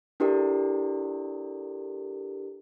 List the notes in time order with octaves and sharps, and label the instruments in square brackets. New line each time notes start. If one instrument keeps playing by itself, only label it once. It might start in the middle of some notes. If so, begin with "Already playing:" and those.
[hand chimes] D4 E4 G4 A4 A#4 D5